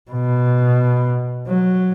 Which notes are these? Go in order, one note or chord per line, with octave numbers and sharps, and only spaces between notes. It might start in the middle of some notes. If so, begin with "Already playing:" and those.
B2
F#3